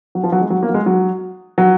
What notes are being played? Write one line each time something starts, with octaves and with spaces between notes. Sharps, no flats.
F#3
F3
F#3
G#3
F#3
A#3
F#3
G#3
F#3
F#3